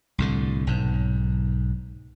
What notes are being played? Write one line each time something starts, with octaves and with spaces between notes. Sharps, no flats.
C2 A2 D3
B1 G#2